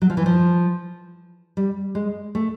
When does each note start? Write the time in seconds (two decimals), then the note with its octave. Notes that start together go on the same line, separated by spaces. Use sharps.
0.02 F#3
0.10 F3
0.17 E3
0.26 F3
1.57 G3
1.95 G#3
2.35 A3